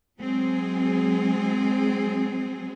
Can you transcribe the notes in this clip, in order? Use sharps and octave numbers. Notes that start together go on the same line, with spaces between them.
F#3 G#3 C4 G#4